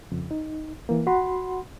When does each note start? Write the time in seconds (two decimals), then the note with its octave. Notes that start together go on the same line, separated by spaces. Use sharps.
0.12 F2 C#3
0.31 D#4
0.89 E3 A#3
1.07 F#4 F#5 B5 C6